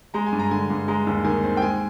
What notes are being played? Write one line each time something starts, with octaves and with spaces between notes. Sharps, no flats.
G#3 A#5
G#5
G2
A#5
D3 G#5
G2
G#3 A#5
D#2
D#3 G#5
C4
G5
G#3 G#5